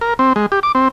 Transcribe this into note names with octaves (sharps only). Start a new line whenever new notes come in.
A#4
C4
G#3
G4
D6
C4